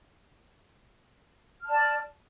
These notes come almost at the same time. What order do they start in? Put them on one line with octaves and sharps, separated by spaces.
F6 A5 D5